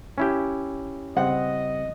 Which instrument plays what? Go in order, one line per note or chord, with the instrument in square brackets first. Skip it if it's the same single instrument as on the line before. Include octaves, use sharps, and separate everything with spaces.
[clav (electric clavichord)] C#4 E4 G4
[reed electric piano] C#3 G3 C4 [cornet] D#5 [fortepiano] F#5